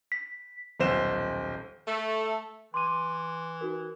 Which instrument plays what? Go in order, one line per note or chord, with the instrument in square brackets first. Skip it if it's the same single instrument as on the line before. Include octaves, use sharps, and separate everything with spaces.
[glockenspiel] B6
[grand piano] D#1 B1 C5 E7
[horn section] A3
[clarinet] E3 [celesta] C6 D6 D#7
[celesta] D#4 F#4 A#4